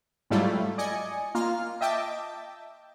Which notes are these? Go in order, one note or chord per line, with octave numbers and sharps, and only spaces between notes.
G#2 F#3 G3 A3 E4 F4
D5 D#5 G#5 C#7
A#3 F4 F6
D#5 E5 G5 A5 D6